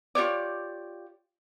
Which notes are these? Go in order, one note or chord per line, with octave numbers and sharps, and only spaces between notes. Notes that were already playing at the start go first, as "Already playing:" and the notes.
F4 G4 C#5 D5